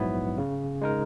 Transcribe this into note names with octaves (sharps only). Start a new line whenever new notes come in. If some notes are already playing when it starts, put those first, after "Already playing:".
Already playing: A#1 G#2 F#3 B3 E4
C#3
G#3 D#4 A#4